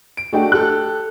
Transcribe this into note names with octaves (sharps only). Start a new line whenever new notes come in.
D7
A3 D4 F#4 G#4 D#5 G5
G4 A4 F#6